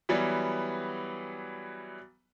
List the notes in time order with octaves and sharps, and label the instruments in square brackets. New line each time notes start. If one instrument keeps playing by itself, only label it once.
[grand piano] E3 F#3 G3 B3